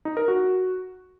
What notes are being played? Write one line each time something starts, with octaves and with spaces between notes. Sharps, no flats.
D#4
A#4
F#4